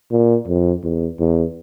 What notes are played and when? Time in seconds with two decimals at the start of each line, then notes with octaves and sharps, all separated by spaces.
0.11 A#2
0.47 F2
0.84 E2
1.20 E2